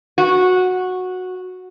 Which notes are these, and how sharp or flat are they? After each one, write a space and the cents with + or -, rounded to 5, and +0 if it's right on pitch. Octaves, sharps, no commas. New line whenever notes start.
F#4 -10 B4 -15